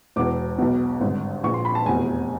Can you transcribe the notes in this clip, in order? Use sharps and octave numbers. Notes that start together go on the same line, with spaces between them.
E1 E2 B2 D6
B1 B2
G#1 G2 D3
A#1 A#2 C#6
C6
B5
A5
F1 E2 B2 G#5